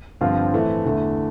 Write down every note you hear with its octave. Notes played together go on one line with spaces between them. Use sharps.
G2 D3 F3 C4 F4
A2 E3 A3 C4
E2 D3 A3